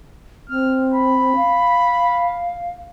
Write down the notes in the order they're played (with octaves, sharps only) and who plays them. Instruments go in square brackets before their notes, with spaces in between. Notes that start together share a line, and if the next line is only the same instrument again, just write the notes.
[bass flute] C4 [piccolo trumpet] F6
[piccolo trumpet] B5
[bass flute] F5